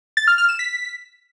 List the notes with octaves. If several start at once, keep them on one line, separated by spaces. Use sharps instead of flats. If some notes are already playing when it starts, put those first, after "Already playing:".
A6
F6
F6
E7
B6